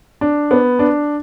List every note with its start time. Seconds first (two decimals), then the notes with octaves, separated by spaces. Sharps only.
0.21 D4
0.51 B3
0.79 D4